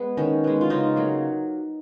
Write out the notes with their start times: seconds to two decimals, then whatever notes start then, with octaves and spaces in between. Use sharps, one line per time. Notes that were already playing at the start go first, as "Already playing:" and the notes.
Already playing: G#3 B3
0.17 D#3 C#4
0.44 G#3 B3
0.61 F4
0.70 C#3 D#4
0.96 F#3 A#3